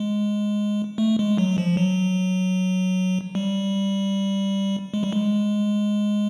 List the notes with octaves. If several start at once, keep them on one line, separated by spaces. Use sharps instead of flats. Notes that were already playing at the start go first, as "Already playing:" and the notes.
Already playing: G#3
A3
G#3
F#3
F3
F#3
G3
G#3
G3
G#3